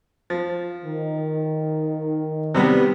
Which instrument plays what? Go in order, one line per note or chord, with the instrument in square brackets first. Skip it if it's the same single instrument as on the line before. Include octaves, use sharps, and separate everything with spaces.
[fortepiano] F3
[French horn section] D#3
[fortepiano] C3 G3 B3